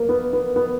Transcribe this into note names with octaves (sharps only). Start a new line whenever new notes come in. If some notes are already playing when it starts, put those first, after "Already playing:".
Already playing: A#3
B3
B3
B3